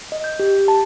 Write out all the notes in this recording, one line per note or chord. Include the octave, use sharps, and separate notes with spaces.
D#5
G6
G4
A5